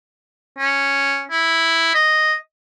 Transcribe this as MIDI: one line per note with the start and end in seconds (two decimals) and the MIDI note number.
0.59 1.24 61
1.31 1.94 64
1.95 2.35 75